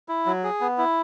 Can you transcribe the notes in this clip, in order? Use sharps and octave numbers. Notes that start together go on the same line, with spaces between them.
E4
F#3
G#4
B3
E4